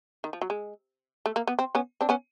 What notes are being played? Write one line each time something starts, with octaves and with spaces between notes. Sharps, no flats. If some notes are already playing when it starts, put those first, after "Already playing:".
D#3
F3
F#3
G#3
A3
A#3
B3
C4
B3 C#4
C4 D4
B3 C#4